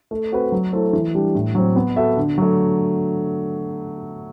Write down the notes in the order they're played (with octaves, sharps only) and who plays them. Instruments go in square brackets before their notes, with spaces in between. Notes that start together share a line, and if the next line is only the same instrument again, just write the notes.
[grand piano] A3
C4 F#4 B4
F#3
A3 E4 A4 C5
E3
G3 D4 G4
A2
F#3 C4
B3
F#4 A4 E5
D3
F#3 A3